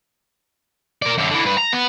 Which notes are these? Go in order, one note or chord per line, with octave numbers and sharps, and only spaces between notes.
A#4 D5
F#2 D3
D3 E3
G2 B4
A#5
B3